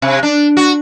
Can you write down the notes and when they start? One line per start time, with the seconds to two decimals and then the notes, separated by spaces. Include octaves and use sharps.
0.02 C3
0.23 D4
0.57 F#4